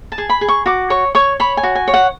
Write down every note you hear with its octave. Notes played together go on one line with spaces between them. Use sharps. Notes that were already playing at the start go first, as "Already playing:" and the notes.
A5
G#4
B5
G#4
C#6
F#4 D6
C#5 C#6
C#5 C#6
C#5 B5
G#5
F#4
G#5
C#5
F#5